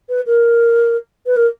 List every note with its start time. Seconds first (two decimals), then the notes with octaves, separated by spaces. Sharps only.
0.09 B4
0.27 A#4
1.26 B4
1.37 A#4